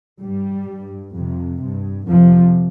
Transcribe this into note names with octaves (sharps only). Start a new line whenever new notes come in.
G2 G3
G2
F2 C3
G2
F2 C3 F3